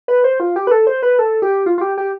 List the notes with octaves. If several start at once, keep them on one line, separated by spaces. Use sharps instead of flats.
B4
C5
F4
G4
B4
A4
C5
B4
A4
G4
F4
F4
G4
G4